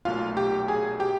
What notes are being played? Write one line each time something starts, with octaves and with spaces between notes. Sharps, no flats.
B1 A#2 F#3 A3 F4 F5
G4 G5
G#4 G#5
G4 G5